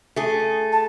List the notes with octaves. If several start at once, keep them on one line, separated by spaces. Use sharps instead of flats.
A3 G#4
A5